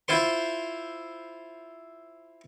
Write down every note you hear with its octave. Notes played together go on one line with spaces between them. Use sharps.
E4 F4 C5 C6